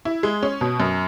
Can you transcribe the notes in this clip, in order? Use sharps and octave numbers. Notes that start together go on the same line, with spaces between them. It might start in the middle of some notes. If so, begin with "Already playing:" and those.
E4
G#3
C#4
B2
F#2